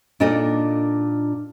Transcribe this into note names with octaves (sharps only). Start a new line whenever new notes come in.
A#2 D4 D#4 A4 D#5